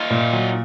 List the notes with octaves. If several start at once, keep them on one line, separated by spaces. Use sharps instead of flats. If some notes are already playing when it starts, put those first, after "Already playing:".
Already playing: D#4 F4
A#2
F#3